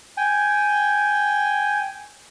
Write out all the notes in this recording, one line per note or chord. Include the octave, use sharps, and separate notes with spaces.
G5 G#5